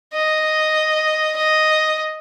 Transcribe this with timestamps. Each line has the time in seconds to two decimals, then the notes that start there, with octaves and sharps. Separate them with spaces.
0.14 D#5
1.37 D#5